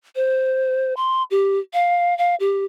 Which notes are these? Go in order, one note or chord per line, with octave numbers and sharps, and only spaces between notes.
C5
C6
G4
F5
F5
G4